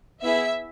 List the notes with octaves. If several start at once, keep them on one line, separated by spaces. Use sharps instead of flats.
B3 E4 G#4 E5